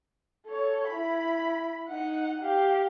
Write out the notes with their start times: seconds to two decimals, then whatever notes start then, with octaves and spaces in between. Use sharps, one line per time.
0.47 A4 C#5
0.88 E4 B5
1.89 D#4 F#5
2.43 G4 F5